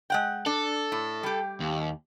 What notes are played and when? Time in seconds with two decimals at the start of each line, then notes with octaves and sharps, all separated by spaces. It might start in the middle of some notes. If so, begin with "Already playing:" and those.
0.10 G#3 F#5 G5
0.46 D4 A4
0.92 A2
1.23 G3 G4
1.60 D#2